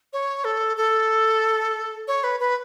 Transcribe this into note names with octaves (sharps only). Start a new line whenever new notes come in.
C#5
A4
A4
C#5
B4
B4